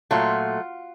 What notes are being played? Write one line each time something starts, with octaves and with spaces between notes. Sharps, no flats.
A#2 F#3 A3 F4